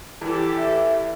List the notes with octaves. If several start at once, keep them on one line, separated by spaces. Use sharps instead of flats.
E2 E3 G4 A4
E5